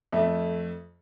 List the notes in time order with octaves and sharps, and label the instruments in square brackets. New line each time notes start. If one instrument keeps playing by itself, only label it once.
[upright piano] F2 A3 E5